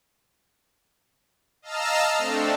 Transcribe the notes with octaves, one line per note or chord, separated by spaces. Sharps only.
D#5 F5 A5 A#5 E6 F6
A3 C4 D4 A4